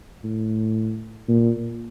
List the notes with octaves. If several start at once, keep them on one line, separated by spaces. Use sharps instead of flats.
A2
A#2